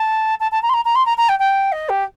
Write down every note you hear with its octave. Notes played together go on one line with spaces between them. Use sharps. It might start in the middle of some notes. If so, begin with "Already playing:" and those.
Already playing: A5
A5
A5
A#5
C6
A#5
A#5
C6
A#5
A#5
G5
G5
D#5
G4